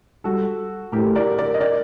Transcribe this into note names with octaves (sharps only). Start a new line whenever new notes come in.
G3 F#4 A4
A2 G4 A#4
A#4 D5
A#4 D5
D#5
A#4 D5